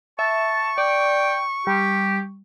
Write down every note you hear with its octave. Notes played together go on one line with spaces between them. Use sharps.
E5 A5 C#6
D5 G5
G3 G4